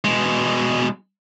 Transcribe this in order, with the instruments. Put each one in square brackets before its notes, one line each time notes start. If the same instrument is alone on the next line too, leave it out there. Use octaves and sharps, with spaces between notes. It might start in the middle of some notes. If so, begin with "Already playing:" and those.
[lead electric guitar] B2 G#3